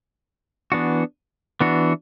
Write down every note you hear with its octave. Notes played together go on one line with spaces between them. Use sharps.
E3 B3 D4 F#4
E3 B3 D4 F#4